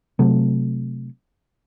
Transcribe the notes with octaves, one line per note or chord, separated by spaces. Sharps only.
C3 F#3 A3